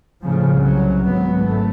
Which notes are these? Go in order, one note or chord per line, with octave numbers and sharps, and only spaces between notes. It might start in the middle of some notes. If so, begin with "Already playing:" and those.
A2 C#3 F3
C2 F#3
G#1 F#3 B3
G#1 A3